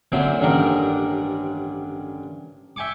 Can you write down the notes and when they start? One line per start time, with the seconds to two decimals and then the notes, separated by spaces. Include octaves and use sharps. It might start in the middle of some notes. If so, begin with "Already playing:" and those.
0.12 A#2 D3 F#3 C4 C5 E5
0.41 A1 G2 D3 D#3 D4 A#4
2.76 E5 G5 G#5 C#6 D6